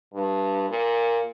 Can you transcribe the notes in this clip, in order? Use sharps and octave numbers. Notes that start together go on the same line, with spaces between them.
G2
A#2